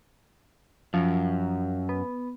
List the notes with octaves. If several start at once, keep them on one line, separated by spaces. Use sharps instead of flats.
F#2 F3
B3